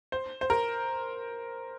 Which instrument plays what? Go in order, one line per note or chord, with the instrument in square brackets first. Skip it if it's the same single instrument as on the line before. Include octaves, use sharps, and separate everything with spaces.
[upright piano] C5
C5
A#4